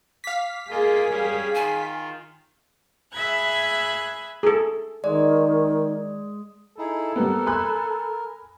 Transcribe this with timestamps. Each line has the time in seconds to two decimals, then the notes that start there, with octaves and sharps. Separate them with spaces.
0.24 F5 D6 B6
0.70 A#3 F4 G#4 A#4 D#5
1.10 G3 C#4
1.55 D#3 F4 G#5
3.13 G#4 E5 B5 F#6 G#6
4.43 G#4 A4
5.04 D#3 G#3 D5
6.78 D#4 E4 G#4 A4
7.16 G3 B3 A#4
7.46 G#5 B5 F#6